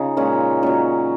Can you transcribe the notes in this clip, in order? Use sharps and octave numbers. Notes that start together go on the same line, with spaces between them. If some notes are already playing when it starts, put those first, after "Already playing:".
Already playing: C#3 D#4 F4
A#2 G#3 C#4
A#2 F#3 C#4